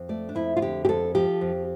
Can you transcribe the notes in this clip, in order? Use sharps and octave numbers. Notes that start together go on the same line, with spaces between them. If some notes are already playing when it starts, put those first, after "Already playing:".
Already playing: F2
A3 D5
D4
F2 E4
F4
D3 G4
G4
F2 A4
F3 G4
F2